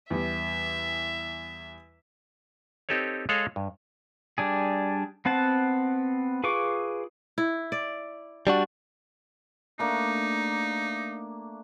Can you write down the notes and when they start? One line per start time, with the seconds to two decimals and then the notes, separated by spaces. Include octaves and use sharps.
0.10 E2 G3 E5
2.89 C4 D#4 G4 A4 B4 C#5
3.29 G#3 G#4 A4 C#5 D#5 F5
3.56 G2
4.38 G3 D4 G#4
5.25 B3 C4 F#5 A5
6.44 F4 G#4 B4 C#6 D6
7.38 E4
7.72 D5
8.47 G3 D4 F#4
9.79 A3 A#3 D4 D#4